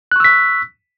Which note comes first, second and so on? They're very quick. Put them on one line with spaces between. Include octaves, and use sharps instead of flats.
F#6 C#6 E6 B6